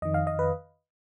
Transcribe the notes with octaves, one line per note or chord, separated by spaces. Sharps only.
F2 D#3 D#5
F5
D#5
B4